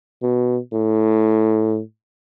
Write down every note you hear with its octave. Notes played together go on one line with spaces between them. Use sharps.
B2
A2